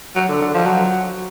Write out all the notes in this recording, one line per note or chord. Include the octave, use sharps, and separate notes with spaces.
F#3
D3
D3
F3
F#3